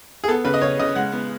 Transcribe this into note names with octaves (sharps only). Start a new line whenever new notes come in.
G#4
B3 A4
C#3 B4
D#5
C#3 C#5
C#3 D#5
G#3 F#5
B3